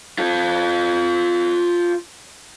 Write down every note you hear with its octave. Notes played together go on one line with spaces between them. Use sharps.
F4 A4